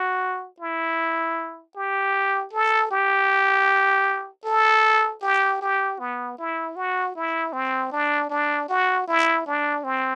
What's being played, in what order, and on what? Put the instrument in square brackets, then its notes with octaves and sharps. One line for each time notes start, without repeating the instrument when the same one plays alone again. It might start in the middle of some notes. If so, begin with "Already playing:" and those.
Already playing: [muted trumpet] F#4
E4
G4
A4
G4
A4
G4
G4
B3
E4
F#4
E4
C4
D4
D4
F#4
E4
D4
C4